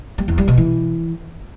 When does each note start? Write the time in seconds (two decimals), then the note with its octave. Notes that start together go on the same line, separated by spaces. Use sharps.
0.18 G3
0.28 E2
0.38 G3
0.48 B2
0.58 E3